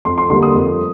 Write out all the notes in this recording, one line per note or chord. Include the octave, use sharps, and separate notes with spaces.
F2 C6
C6
D3 G3 A#3 C6
D#6
F2